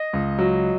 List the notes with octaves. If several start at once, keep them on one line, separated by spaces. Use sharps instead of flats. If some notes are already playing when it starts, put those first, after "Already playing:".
Already playing: D#5
C#2
F#3